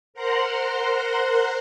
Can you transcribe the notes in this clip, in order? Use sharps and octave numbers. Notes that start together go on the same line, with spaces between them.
A#4 C5 F#5 A#5 C6 F#6